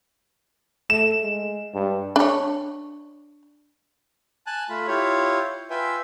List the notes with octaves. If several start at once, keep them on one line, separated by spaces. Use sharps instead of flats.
A3 E7
G#3
G2
D4 C#5
G#5 A5 F#6
A3 F4 B5
E4 F4 G4 C#5
F4 B4 E5 G5 G#5